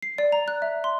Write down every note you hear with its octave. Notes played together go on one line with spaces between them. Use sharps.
C7
D5
A#5
F#6
E5
C6